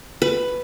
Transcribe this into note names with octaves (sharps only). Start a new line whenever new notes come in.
B4